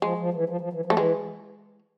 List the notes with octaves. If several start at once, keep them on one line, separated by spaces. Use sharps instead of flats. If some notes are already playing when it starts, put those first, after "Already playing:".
F3 G#3
F3
E3
F3
F3
E3
F3
A3
E3 G#3